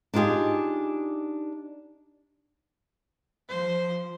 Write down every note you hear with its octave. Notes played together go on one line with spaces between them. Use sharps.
D4 D#4 F4 G4 G#4
F3 C5